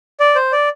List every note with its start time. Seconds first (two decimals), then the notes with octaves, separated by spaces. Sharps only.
0.20 D5
0.35 C5
0.52 D5